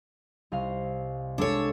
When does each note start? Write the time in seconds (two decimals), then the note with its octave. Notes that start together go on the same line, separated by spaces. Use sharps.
0.52 C2 D#5 F5
1.38 G#3 D4 A4 C#5